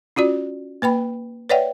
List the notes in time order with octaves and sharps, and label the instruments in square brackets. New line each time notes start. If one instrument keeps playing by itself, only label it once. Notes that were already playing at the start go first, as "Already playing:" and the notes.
[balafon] C#4 F4 F#4 D5
A#3 B4 G5 B5
B4 C#5 D5 E5 F#5 G5